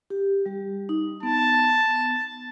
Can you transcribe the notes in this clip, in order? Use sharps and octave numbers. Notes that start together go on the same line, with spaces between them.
G4
G3 G4
D#4
B3 A5